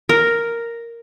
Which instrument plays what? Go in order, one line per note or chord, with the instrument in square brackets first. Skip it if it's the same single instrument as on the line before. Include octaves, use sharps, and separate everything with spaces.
[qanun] A#4